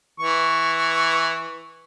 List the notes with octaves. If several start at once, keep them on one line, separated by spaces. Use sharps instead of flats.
E3 C#6